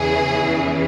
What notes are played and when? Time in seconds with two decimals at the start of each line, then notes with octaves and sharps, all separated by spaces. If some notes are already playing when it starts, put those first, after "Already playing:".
Already playing: E2 C#3 E3 G#4